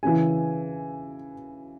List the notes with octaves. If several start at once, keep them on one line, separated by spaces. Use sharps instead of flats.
C#3 E3 G#5